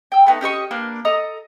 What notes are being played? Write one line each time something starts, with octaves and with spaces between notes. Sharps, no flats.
G5 E6
A3 B3 D#4
C#4 G4 D#5 C#6
A#3 D4 A#4 B4
A4 D#5 A#5 D#6